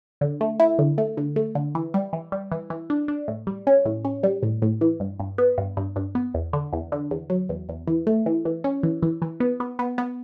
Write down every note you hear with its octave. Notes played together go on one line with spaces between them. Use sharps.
D3
A3
E4
D3
A3
D3
A3
D3
E3
G3
E3
G3
E3
E3
D4
D4
A2
G3
C#4
A2
C#4
G3
A2
A2
E3
G2
G2
B3
G2
G2
G2
B3
E2
D3
E2
D3
E2
F#3
E2
E2
E3
A3
E3
E3
C#4
E3
E3
E3
B3
B3
B3
B3